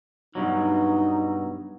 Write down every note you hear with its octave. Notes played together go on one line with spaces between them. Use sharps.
G2 B2 F#3 D#4